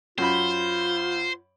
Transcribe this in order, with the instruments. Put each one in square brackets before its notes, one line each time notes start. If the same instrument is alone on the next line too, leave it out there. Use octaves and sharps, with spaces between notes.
[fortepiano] F#2 B5 [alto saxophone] F4 [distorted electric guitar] C5